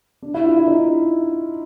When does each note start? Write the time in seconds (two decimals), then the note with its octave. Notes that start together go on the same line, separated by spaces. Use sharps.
0.22 D4
0.34 E4
0.45 F4
0.57 E4
0.68 D#4